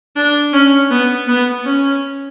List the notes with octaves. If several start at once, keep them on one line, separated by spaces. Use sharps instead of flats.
D4
C#4
B3
B3
C#4